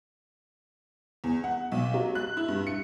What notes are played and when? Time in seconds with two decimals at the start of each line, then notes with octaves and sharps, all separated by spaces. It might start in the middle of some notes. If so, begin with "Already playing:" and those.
1.24 E2
1.44 F#5
1.72 B1
1.94 F#3
2.15 F#6
2.37 E4
2.48 G2
2.67 C#7